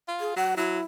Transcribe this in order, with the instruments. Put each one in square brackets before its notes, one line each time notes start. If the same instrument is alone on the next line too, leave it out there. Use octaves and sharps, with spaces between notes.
[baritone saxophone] F4
[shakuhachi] G#4
[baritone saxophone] F#3 [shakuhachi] F#5
[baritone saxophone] F#3 [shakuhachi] E4